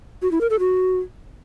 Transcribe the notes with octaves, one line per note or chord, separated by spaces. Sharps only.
F#4
E4
A#4
A4
F#4